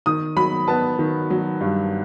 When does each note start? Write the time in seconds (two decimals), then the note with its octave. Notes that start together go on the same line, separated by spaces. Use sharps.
0.06 D#3 D#6
0.37 F#3 B5
0.68 B3 A5
0.99 D#3
1.30 F#3
1.61 G2